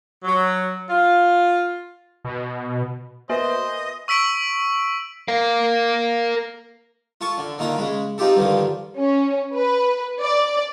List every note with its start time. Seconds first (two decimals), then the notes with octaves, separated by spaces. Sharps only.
0.24 F#3
0.89 F4
2.25 B2
3.29 A#3 B3 F#4 B4 C5 D#5 E5 G#5
4.08 C#6 E6 B6 D7 F#7
5.28 A#4 F5
7.21 F4 A4 A5 C#6
7.38 D3
7.58 D3 D#3 A#3 F4 F5
7.76 C#3 G#3 B5
8.18 C4 D#4 F4 G4 A4
8.36 G2 D3 D#3 F3
8.97 C#4
9.55 B4
10.21 D5